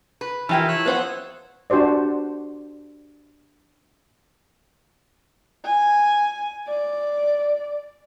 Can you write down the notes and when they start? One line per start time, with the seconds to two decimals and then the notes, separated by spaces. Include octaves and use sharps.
0.21 B4
0.49 E3 F3 E4 G4 A#4
0.68 C#5 E6 F#6
0.86 B3 C5 F#5
1.70 D4 F#4 G4 C5 D5
5.66 G#5
6.68 D5